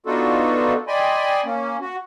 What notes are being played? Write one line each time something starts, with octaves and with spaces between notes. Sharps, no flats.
B3 D4 D#4 F4 F#4 A4
D5 D#5 G5 G#5 B5 C6
A#3 C#4
F#4